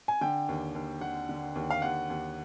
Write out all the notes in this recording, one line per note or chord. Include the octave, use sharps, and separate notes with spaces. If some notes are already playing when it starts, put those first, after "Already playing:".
G#5
D3 G5
D#2
D#2
D3 F#5
D3
D#2
F5
D#2 F#5
D#2